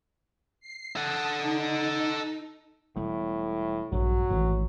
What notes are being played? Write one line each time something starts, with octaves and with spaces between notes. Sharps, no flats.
C7
A4 F#5 A5 D#6
D#4
E1 A2 G3 B3
A#1 G2 F#3 D4
A1 G#2 D#3 A3